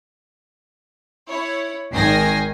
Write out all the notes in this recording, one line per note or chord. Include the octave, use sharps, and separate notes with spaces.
E4 C#5
G#1 D#3 G5 G#5 A#6 C7